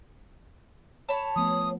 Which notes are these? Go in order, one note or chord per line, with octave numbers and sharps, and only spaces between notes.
C#5 A5 B5
F3 A3 B3 D#6